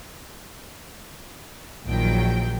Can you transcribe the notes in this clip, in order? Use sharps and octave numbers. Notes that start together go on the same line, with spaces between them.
A#1 D#3 F#3 G5